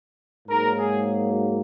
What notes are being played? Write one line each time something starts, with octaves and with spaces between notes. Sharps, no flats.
G#2 F#3 A#3 A#4
G#4